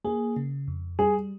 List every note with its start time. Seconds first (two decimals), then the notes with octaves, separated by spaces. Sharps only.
0.04 A#3 G#4
0.36 C#3
0.68 F2
0.99 G3 G#4